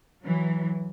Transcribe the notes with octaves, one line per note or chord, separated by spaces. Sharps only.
E3 F#3